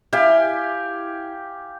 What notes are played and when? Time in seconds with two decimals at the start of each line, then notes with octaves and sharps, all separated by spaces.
0.13 E4 G4 F5 G#5